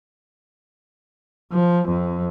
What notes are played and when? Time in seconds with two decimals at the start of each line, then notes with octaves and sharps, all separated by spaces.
1.53 F3
1.89 F2